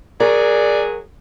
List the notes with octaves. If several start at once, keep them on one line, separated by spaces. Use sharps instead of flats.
F#3 G#4 A#4 D5